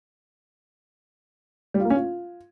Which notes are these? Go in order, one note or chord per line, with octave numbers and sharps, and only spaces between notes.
G3
F4
A#3
C#4
F4